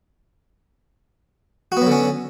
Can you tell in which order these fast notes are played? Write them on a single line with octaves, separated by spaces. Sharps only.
F#4 B3 F#3 D3 C#4